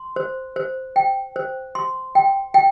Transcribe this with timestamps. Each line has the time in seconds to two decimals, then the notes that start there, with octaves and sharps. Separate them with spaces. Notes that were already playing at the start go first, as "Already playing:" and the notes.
Already playing: C6
0.16 C5
0.56 C5
0.96 G5
1.36 C5
1.75 C6
2.15 G5
2.54 G5